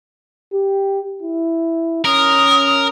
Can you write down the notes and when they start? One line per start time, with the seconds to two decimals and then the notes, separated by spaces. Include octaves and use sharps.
0.53 G4
1.22 E4
2.05 C#4 A#4 D#6